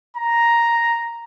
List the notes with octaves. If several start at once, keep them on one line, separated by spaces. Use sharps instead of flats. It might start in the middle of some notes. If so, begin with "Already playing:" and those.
A#5